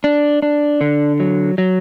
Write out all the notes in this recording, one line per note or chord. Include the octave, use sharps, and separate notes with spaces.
D4
D4
D3
F#3
F#3